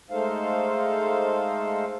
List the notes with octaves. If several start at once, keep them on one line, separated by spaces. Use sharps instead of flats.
G#3 A3 D#4 A4 C5 F5